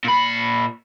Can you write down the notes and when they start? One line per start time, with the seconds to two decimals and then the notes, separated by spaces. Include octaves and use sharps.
0.04 A#2 B5